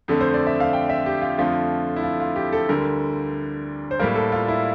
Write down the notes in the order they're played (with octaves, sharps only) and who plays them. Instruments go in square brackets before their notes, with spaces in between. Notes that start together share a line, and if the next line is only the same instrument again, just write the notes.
[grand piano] F2 D3 A3
C5
D5
E5
F5
G5
E5
G4
F4
F2 D3 F3 A3 F4
E4
F4
F4
G4
A4
D2 D3 G3 A#4
C5
A2 G3 A#3 A#4
A4
F4
E4